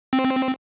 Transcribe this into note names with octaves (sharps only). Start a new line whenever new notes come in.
C4